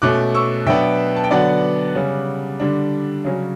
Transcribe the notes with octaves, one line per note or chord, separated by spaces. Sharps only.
B2 A3 C#4 D6 F#6
C#6 E6
B2 F#3 B3 D4 E5 G5
A5
G5
D3 F#3 B3 D4 D5 F#5
C#3 G3 C#4
D3 G3 D4
C#3 F#3 C#4